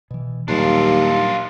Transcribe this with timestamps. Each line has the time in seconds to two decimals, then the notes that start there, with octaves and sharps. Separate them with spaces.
0.11 B2 E3
0.48 D#2 A#2 F#3 G3 D4 F4